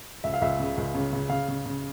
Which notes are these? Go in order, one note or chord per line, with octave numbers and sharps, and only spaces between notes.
C#2 E5
F5
C#2 E5
C#3
C#2
C#3
C#3
C#3 F5
C#3
C#3